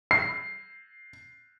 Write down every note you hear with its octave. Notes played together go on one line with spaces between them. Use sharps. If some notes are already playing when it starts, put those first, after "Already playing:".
C7